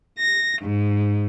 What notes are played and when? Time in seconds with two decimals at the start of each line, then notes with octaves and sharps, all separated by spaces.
0.18 A#6
0.61 G#2